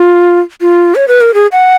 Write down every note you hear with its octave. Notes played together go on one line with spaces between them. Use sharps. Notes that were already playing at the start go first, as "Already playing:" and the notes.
Already playing: F4
F4
C#5
B4
A#4
G#4
F#5